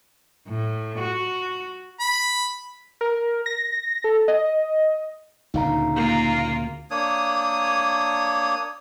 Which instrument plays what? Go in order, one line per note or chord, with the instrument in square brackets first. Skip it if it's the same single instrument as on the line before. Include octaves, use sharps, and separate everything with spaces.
[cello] A2
F#4
[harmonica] B5
[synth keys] A#4
A#6
A4
D#5
[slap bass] D2 A#2 C#3 [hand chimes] D#4 F5 A#5
[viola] A#3 F4
[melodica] A#3 D4 C#5 D#6